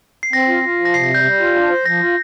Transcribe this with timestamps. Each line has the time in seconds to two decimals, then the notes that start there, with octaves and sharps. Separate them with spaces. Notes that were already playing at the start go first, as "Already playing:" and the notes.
0.23 C7
0.33 C4 A#6
0.48 F4
0.63 F4
0.79 F3
0.85 A#6
0.94 C3 C7
1.04 A#6
1.09 G3
1.14 G6
1.24 G3
1.40 F4
1.55 D4
1.70 C5
1.86 F3 A#6
2.01 F4